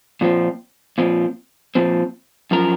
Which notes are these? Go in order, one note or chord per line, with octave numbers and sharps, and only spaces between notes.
A#2 F3 C4
A#2 F3 C4
A#2 F3 C4
F#2 F3 A#4